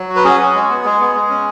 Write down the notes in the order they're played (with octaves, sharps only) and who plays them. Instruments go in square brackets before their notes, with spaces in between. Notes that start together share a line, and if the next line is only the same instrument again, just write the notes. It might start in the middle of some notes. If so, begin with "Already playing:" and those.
Already playing: [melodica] F#3
F#4
B4
C#4 G#4
F#4
G#3
B3
G#3 G#4
B3
G#3
C#4